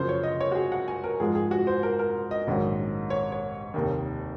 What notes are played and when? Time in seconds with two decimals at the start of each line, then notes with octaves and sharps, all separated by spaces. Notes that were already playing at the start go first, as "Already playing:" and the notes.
Already playing: F#2 C#3 F3 A#3 C5
0.09 C#5
0.23 D#5
0.41 C#5
0.52 F#4
0.55 G#4
0.72 F#5
0.88 G#5
1.04 A#4
1.20 G#2 F3 G#3 G#4
1.35 G#4
1.51 F#4
1.67 C5
1.83 A#4
1.99 A#4
2.31 D#5
2.47 A#1 G#2 D#3 F#3 C#4
3.10 C#5
3.32 C#5
3.74 F1 D#2 D#3